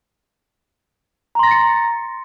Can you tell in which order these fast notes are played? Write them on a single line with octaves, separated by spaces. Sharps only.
A#5 C6 A#6 A6 C#7